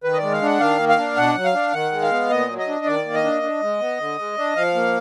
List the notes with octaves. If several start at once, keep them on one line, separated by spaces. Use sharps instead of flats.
D#3 B4
D#5
G#3 D5
F5
D4 F#5
D#3 F5
A#3
F5
D4
B2 F#5
F#3
F5
D4
D#3 F#5
G#3
F5
B3
A#2 D#5
F#3
D#5
D4
D#3 D5
A#3
D#5
D4
D4
G#3
B3
D3
G#3
D4
F3 F5
A#3